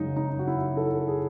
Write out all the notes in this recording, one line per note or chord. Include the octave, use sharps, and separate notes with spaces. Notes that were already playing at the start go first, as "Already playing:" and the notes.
Already playing: F#2 C#3 G#3 D#4
D#4
F#4
E4
A4
G#4